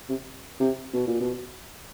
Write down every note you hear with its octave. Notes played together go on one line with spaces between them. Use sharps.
C3
C3
B2
A#2
B2